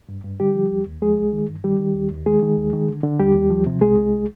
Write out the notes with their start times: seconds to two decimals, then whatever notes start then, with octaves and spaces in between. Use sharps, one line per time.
0.09 G2
0.24 G2
0.40 D3 G3 G4
0.55 F3
0.71 D#2
0.86 D#2
1.02 F3 G#3 G#4
1.18 C2
1.33 D#3
1.49 G2
1.64 D#3 G3 G4
1.80 D#3
1.95 D#2
2.11 D#2
2.26 D#3 G#3 G#4
2.42 D#3
2.57 D#2
2.73 D#3
2.88 D3
3.04 D3
3.19 D#2 G3 G4
3.35 D#2
3.50 F3
3.66 C3
3.81 C2 G#3 G#4
3.97 C2